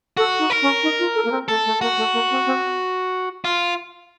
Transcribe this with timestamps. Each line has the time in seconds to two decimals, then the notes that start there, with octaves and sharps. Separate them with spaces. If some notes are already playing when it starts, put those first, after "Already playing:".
0.17 F#4 A4
0.39 D#4
0.50 A#4
0.62 C#4
0.83 D#4
0.99 F4
1.15 A4
1.25 A#3
1.32 C4
1.48 A3 A4
1.65 A3
1.81 A#3 F#4
1.97 A3
2.13 A#3
2.31 C4
2.46 C4
3.45 F4